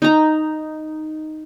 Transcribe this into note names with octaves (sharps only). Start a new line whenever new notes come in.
D#4 A#5